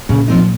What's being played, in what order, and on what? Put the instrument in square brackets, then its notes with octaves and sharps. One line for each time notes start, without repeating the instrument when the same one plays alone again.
[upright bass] A#2 [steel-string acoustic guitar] C#3
[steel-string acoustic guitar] F3 C4 D#4